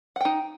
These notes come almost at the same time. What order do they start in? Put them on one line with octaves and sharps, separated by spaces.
F#5 G5 D#4